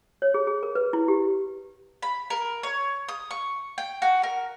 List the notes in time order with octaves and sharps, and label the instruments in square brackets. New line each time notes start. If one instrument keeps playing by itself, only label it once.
[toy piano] C#5
G#4
G#4
A#4
B4
E4
G4
[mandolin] B5
A#4
C#5
D#6
C#6
G5
F#4
A#4